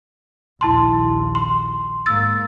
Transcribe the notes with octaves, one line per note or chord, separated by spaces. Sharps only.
A#1 D#2 E4 A5 C6
C6
G#2 A#3 E6 A6